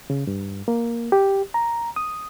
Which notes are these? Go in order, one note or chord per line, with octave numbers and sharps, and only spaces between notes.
C#3
G2
A#3
G4
A#5
D#6